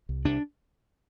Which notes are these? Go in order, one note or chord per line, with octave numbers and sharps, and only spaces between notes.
C2
C2 D4